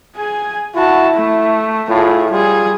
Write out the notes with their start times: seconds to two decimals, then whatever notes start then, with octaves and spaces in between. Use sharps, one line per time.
0.16 G#4 G#5
0.75 E4 F#4 A5
1.14 A3
1.90 A2 F4 G#4
2.31 G3 F4 G#4